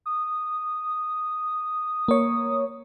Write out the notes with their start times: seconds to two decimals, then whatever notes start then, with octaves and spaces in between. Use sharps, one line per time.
0.06 D#6
2.08 A#3 C#5